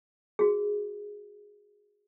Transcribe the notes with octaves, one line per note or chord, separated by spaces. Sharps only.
F#4 G#4